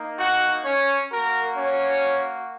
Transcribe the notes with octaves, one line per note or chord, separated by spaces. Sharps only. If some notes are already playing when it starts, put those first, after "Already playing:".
Already playing: A#3 D#4
F#4 F#5
C#4 C#5
A#3 F#4 A#4
C#4 C#5